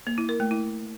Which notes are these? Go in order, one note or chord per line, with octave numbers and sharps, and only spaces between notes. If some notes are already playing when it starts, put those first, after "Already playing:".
A#3
E4
A#4
A3
E4